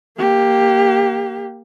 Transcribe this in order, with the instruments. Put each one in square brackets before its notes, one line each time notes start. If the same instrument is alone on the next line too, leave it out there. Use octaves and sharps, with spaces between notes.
[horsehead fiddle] A#3 G4